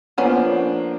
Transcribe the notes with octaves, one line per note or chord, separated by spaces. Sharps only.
F3 A#3 B3 C#4 D4